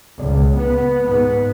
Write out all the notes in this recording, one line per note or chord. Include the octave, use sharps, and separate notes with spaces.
C#2
B3
G#2 B3